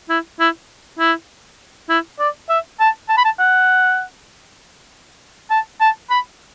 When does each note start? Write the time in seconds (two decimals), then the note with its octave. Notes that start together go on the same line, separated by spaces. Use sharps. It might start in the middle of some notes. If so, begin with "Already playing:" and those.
0.09 E4
0.40 E4
0.99 E4
1.89 E4
2.20 D5
2.49 E5
2.80 A5
3.09 A5
3.17 B5
3.25 A5
3.39 F#5
5.50 A5
5.80 A5
6.10 B5